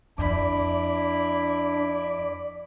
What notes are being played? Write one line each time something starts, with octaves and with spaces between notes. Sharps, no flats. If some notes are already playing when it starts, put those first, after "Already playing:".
F2 D4 E4 D5 B5